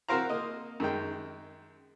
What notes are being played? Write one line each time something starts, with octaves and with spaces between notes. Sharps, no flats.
C4 F#4 A#4 C5 F5 A#5
A#3 D#5
F#2 D#3 G#3 G5